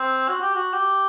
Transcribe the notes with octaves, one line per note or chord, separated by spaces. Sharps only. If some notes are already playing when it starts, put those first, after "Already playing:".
Already playing: C4
F#4
G4
F#4
G4